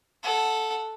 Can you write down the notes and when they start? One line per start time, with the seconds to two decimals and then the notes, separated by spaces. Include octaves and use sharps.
0.23 A4 F#5